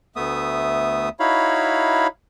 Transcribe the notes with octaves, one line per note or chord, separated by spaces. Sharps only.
D2 A3 B3 E5 D#6
D#4 E4 F#4 C#5 F5 B5